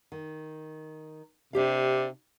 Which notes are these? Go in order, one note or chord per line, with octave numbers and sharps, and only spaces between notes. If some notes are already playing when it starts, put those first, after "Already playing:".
D#3
C3 D4 G4 F5